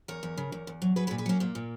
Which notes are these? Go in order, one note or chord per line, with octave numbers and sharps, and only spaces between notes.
E2 A#4 C#5
E2
C#3
E2
E2
F#3
F#3 G#4 B4
G#4 B4
A#2
G#4 B4
F#3 A#3 C#4
A#2 A#3
A#2